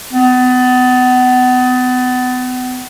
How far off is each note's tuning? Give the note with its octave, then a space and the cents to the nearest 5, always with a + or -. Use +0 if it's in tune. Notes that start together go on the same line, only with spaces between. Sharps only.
B3 +30